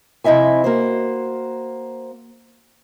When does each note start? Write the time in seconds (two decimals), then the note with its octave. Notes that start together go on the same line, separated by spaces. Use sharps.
0.24 F2 C3 E4 D#5 E5 G#5
0.64 A#3 F#4 C5